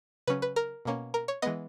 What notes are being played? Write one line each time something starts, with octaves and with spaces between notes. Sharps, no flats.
C#3 F#3 C#4 B4
B4
A#4
B2 A#3 C#4
A#4
C#5
E3 G#3 B3 D#5